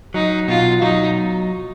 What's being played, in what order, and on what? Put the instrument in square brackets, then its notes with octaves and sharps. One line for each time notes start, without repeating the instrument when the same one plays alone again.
[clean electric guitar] F#3 [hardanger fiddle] D#4
[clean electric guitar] B2 [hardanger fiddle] F4
[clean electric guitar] F#3 [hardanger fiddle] D#4